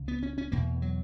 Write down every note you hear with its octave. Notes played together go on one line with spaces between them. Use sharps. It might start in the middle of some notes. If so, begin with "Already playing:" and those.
Already playing: C#2 C#3
B3
C#4
C#4
E2 B2 A#3
F#3